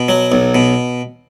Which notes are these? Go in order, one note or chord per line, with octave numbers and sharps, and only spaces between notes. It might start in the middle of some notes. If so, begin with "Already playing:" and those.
Already playing: B2
F#3
B1
B2